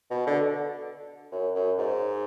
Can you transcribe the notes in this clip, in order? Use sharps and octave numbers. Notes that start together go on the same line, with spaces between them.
B2
D3
F#2
F#2
G#2